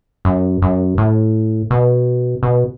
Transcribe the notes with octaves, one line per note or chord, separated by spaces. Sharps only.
F#2
F#2
A2
B2
B2